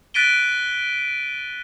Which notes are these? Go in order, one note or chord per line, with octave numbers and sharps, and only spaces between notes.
F#6 A6 B6 D7 D#7 G7